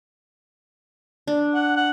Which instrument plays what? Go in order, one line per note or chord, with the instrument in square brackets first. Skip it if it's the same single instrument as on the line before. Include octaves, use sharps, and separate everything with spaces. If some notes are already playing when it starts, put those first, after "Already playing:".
[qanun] D4
[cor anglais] F#5
F#5